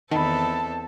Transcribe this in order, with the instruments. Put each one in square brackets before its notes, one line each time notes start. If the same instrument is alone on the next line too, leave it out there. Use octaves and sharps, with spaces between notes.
[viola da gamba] E2 C4 A4 [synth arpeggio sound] D#3 [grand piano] D#5 B5 [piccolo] A5